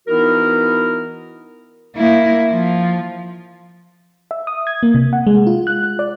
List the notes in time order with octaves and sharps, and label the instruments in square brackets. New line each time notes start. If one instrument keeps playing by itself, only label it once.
[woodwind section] E3 B3 D#4 E4 F#4 A#4
[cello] A#3 E4
F3
[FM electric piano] E5
D#6
G#6
A#3
C3
F#5
G#3
F4
F#6
D5